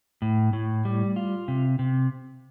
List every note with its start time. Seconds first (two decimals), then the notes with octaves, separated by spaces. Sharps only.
0.22 A2
0.53 A2
0.85 G3
1.16 F4
1.48 C3
1.79 C3